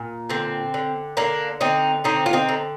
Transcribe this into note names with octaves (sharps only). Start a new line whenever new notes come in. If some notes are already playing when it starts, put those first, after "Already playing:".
Already playing: A#2
D3 C4
D3
D3 A#3 D4
D3 C4 D#4
D3 C4 D#4
F4
C4 D#4
D3